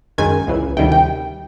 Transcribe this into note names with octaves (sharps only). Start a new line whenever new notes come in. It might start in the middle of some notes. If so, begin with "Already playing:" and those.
F#2 D#3 G#3 G#5
C#2 C#3 E3
D2 C3 D#3 G3 G5
G5